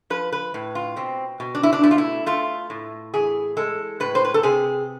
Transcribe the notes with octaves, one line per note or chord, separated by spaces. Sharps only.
F3 B4
B4
A2
F4
B2 C4
B2
D4
E4
D4
A3 E4
F4
E4
A3 F4
A2
E3 G#4
G#3 A4
A2 B4
C5
B4
A4
C3 G#4